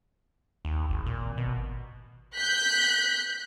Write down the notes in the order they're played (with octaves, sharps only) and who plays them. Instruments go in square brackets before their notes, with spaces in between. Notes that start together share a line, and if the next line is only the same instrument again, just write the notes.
[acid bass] D#2
G#1
A#2
[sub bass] G#1
[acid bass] B2
[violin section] F#6 G6 B6